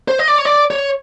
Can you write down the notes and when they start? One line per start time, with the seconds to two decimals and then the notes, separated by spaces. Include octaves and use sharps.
0.08 C5
0.19 D#5
0.28 D5
0.38 C#5
0.45 D5
0.70 C#5